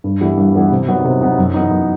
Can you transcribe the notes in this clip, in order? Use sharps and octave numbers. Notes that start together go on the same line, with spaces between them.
G2
E3 G3 B3 E4
G2
E3 G3 B3 E4
C3
F#3 B3 D#4
C3
F#3 B3 D#4
F#2
E3 B3 D#4
F#2